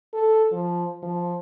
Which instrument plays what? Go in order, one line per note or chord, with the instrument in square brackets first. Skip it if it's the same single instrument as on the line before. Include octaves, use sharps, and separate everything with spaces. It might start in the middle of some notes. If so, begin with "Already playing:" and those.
[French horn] A4
F3
F3